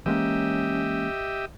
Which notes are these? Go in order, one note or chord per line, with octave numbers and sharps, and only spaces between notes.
E3 G#3 A#3 C#4 G4 D#5 E5